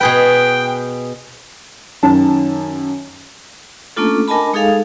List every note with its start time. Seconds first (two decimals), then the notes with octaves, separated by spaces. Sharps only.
0.01 B2 G#4 B4 G5
2.03 F#2 D#3 A5
3.97 A3 A#3 C#4 D4 F4 A4
4.28 D4 A#4 D#5 G#5 A5 B5
4.53 G#3 D#4 G#4 A4 F5